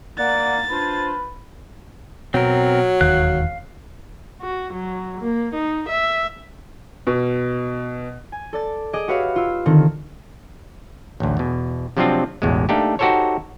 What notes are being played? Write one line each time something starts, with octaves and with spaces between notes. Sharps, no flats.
A#3 D5 F#5 A6
D4 F4 B4 C5
B2 F#3 C4 A#4
E1 D#2 D#3 F5 F#6
F#4
F#3
A#3
D#4
E5
B2
G#5
A4 D5 A6
G#4 D#5 D6 D7
F#4 G4 B4 C#5 E5 F5
F4 E6
D3 D#3 C4
A1 D2
E2 B2
C3 F3 F#3 C4 D4 F4
A1 E2 B2 G#3
A3 A#3 D4 D#4 G4
D#4 F#4 G4 A4 C5 C#5